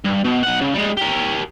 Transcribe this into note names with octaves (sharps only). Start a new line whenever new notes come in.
G2
B2
B1 F#5
C#3
G3 G#3
G4 A#4